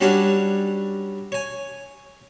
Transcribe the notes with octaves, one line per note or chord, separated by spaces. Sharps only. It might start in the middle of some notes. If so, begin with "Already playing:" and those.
F#3 G3 C#4 D4 F#4 C#5
C#5 G#5